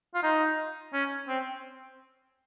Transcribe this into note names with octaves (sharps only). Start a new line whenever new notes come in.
F4
D#4
C#4
C4